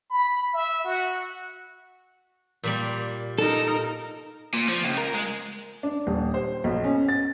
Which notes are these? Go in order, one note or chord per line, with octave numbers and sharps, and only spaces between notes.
B5
E5
F#4
A#2 G3 A#3
D#4 A4 A#4
A#2
F3
C#2
A#4
G#3
D4
D#1
C5
B1
C#4
A6